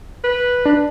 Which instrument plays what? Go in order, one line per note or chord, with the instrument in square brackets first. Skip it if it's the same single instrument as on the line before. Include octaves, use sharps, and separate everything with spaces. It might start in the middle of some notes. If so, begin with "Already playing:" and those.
[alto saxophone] B4
[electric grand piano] D4